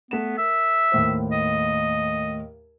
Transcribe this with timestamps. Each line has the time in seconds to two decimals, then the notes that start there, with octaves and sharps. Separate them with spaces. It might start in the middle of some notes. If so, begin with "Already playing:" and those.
0.11 A3 B3 E7
0.38 A#4 E5
0.92 D#2 A2 C5
1.32 D#5